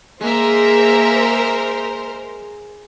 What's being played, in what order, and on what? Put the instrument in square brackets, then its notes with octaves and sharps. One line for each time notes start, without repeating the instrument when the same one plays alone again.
[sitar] G#3 [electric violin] A#3 E5 [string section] A#4 C5